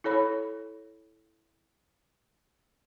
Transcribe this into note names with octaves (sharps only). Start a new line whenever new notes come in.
E4 A4 C#5 B5